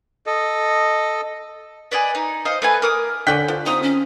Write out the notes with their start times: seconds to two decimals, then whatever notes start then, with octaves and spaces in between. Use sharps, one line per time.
0.26 A4 D#5
1.91 B4 D5 D#5 G#5
2.15 D#4
2.45 C5 D#5 F5
2.62 A3 B4 G#5
2.82 A#4 D6 D#6
3.27 D3 C#4 D5 G5 F#6 B6
3.48 F3
3.66 C4 D#4 F4 D#6
3.83 C#4